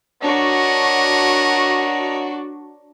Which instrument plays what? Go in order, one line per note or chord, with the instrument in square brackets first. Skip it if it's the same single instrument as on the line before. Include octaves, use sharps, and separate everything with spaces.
[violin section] D4 F#4 [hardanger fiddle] A#4 C#5 [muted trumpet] D#5